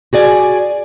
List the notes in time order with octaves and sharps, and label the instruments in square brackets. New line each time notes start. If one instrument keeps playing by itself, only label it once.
[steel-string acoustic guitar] F#4 G#4 D5 G#5